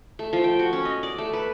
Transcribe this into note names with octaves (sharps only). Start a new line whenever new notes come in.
A3
F3
G5
F#4
C#4
D#5
D5
A3
B4